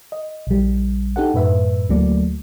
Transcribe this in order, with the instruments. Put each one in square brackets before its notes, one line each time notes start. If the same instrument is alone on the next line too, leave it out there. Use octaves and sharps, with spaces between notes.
[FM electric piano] D#5
A#1 G3
D#4 G4 A4 F#5
F#2 A2 B4 E5
D2 F#3 A3 A#3 D5